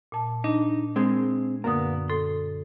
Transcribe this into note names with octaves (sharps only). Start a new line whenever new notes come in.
A#2 A5
D4 D#4
G#3 C4
F#2 D3 A#3 B3 D#6
A4 C6